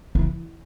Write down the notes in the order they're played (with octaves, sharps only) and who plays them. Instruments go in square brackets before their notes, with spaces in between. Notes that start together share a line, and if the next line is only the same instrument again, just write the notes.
[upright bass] E3